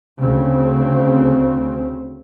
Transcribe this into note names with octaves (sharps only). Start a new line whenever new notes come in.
D2 C#3 C4